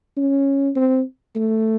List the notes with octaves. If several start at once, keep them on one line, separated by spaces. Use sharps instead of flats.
C#4
C4
A3